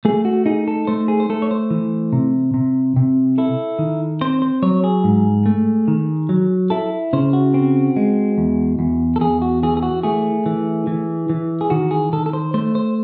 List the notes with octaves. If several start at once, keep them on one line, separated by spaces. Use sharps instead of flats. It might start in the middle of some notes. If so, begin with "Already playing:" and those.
A3 G#4
F#4
D#4 G#4
A4
A3 C5
G#4
C5
A3 A4
C#5
C5
E3
C3
C3
C3
E4 A4
D#3
C4 C5
C5
F#3 C#5
G#4
G#2
A3
D#3
F#3
E4 A4
C#3 C5
F#4
C4
G#3
E2
E2
A4
E2 G#4
F#4
E3 G#4
G#4
F#4
A3 G#4
E3
E3
E3
G#4
D#3 F#4
G#4
D#3 A4
A4
C5
A3 C5
C5